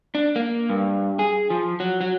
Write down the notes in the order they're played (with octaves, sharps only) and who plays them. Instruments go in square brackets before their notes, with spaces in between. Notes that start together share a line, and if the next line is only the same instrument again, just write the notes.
[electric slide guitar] D4
A#3
G2
G#4
F3
F#3
F#3